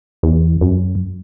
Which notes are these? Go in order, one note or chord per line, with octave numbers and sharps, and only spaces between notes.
E2
F#2